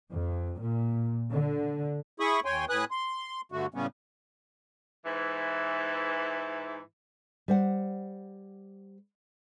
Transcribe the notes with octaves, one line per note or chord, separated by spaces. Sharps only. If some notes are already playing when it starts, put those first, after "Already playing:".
F2
A#2
D3
E4 G#4 B5 C#6 D#6
D#2 C#5 G5 G#5 C6
A2 B4 G#5 D#6 F#6
C6
G2 D3 A3 F#4
A2 C#3 G3 B3 C#4
G#2 E3
G3 C5 F#5